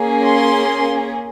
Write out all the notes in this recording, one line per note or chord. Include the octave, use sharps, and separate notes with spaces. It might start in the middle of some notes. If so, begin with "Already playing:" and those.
Already playing: A#3 C#4 G#4
C6